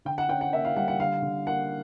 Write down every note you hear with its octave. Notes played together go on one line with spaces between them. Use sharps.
D3 G5
F#5
C#4 G5
F#5
A#3 E5
F5
G3 F#5
F#5
D3 F5
D3
A#3 F#5